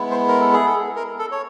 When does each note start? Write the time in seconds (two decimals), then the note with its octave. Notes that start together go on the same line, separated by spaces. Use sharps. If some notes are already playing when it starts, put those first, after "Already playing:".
Already playing: G#3 B3 E4
0.11 C5
0.28 A#4
0.41 A4
0.53 G#4
0.66 A4
0.96 A#4
1.19 A4
1.32 C#5